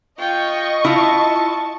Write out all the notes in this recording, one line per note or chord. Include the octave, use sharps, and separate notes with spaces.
F4 D#5 G5 C#6
E4 F4 A5